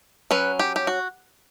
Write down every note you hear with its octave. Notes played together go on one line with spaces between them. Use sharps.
F#3 C#4 B4
G4
G4
F#4